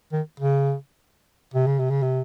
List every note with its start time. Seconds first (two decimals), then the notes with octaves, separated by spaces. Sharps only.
0.12 D#3
0.40 C#3
1.54 C3
1.67 C#3
1.79 C3
1.90 C#3
2.02 C3